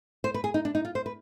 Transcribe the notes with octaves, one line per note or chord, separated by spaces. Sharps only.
C5
B4
G#4
D#4
D4
D#4
F4
C5
B4